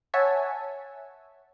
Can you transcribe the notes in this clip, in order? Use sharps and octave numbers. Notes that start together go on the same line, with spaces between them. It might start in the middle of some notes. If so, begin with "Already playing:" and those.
C#5 E5 F#5 G#5 A5